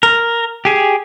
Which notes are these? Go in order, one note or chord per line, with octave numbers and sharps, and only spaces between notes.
A#4
G4 G#4